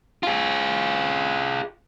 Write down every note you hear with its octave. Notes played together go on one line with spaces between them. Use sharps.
F4 G#4